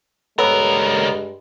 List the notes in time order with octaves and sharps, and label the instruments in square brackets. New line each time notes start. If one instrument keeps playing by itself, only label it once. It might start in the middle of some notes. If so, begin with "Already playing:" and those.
[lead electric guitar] C#2 A#4 [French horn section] G2 G#3 [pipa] B3 [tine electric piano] A4 C#5 E6